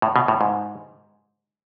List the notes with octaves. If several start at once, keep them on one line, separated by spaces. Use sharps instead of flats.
A2
B2
A2
G#2